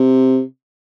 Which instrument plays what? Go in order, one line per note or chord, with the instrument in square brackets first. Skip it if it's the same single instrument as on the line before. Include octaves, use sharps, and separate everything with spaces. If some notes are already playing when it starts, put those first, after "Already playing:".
Already playing: [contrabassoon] C3